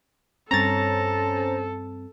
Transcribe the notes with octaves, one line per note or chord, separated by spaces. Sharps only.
G2 C4 C#4 A4 C5 A#5 A6